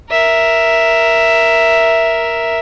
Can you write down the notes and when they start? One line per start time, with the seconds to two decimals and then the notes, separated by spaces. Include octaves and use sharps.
0.11 A#4 E5